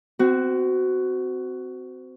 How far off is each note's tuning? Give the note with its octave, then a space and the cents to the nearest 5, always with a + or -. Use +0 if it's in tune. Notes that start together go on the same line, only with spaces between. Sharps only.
C4 -25 F#4 +10